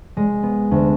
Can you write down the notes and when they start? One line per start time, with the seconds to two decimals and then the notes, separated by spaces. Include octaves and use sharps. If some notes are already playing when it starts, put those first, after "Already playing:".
0.17 G#3
0.43 B3
0.71 D2